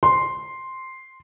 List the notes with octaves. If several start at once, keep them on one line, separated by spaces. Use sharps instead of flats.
C6